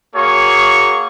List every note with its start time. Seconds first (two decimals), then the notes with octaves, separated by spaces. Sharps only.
0.16 A#3 F#4 G#4 C#5 C#6